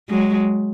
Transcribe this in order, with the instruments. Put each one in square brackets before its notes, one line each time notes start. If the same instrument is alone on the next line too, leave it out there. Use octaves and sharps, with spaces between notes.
[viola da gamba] F#3 G#3